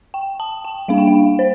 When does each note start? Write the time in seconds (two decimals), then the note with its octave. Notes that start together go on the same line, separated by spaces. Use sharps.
0.14 G5
0.40 A5
0.64 G5
0.88 G3 A#3 D4 F5
0.98 G5
1.07 F5
1.39 C5